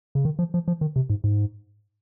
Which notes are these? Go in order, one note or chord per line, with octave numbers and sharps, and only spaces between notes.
C#3
D#3
F3
F3
F3
D#3
C3
G#2
G#2